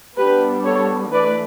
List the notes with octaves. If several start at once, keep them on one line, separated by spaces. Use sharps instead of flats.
G3 B3 D4 G4 B4
A4 C#5
E3 A3 B4 D5